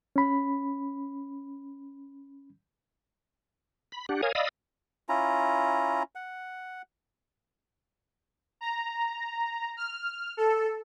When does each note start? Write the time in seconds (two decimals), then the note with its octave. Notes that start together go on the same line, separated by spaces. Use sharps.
0.16 C#4 B5
3.92 B5
4.09 D4 G4 F#5
4.23 A#4 C#5 F5 G#5 D#6
4.35 D5 D#5 F5 B5 D#6 E6
5.09 C#4 E4 F4 A#5
6.15 F#5
8.61 A#5
9.77 F6
10.37 A4